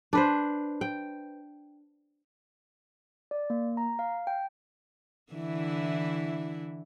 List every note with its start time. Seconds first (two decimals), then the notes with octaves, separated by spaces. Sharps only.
0.13 D4 B4 C5
0.81 G5
3.31 D5
3.50 A#3
3.77 A#5
3.99 F5
4.27 G5
5.32 D3 E3 E4